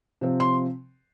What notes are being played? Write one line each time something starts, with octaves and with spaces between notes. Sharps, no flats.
C3 F3 C4
C6